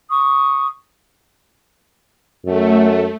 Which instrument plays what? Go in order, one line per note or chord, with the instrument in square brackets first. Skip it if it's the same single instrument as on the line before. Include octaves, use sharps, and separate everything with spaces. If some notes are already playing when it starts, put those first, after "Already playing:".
[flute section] C#6 D#6
[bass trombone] F#2 [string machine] A3